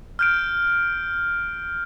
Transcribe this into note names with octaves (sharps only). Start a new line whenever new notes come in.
F6 G6 D7